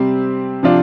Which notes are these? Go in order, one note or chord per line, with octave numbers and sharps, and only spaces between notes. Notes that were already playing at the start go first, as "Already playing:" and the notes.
Already playing: C3 G3 C4
C3 F3 D4 F4